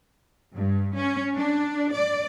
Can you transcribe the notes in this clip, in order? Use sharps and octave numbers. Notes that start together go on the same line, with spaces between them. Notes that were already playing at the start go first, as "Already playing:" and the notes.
G2
C#4
D4
D5